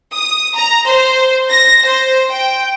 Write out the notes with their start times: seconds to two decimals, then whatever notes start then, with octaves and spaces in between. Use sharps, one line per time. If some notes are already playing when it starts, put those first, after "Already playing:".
0.14 D#6
0.55 A#5
0.86 C5
1.52 A#6
1.86 C5
2.30 G5